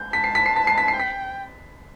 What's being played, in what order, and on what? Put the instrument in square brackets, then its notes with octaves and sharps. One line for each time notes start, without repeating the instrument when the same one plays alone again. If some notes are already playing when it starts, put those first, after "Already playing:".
Already playing: [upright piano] G6
[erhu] A5 [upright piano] B6
[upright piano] C7
B6
C7
B6
C7
B6
C7
[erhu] G5
[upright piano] B6